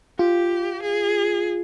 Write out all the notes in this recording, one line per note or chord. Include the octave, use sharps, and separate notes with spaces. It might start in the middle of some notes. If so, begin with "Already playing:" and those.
F4 G4
G#4